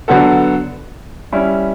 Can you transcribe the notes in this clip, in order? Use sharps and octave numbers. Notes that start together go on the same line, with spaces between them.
D3 F#3 B3 F#4 A4
G3 C#4 E4